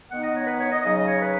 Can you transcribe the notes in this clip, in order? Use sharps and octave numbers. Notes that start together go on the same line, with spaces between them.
D#3 B3 D#4 F#5
D#5
C#5
B4
C#5
D#5
C#3 F#3 D#4 D#5
D#5
C#5
B4